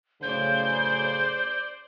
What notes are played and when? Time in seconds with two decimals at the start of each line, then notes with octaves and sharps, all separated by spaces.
0.23 F#2 A2 C#3 C5 D5 G6